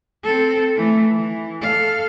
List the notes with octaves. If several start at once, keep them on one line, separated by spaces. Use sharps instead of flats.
C4 A4
E3 A3
E3
A4 F5